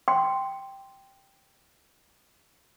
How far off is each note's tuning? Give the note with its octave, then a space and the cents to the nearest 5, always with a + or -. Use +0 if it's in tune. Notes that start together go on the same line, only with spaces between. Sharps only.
G5 +0 C6 -5